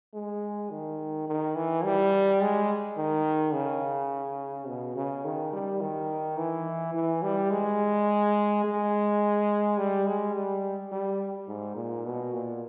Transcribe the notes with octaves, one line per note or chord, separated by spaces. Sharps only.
G#3
D#3
D#3
E3
G3
G#3
D#3
C#3
B2
C#3
D#3
G3
D#3
E3
E3
G3
G#3
G#3
G3
G#3
G3
G3
G#2
A#2
B2
A#2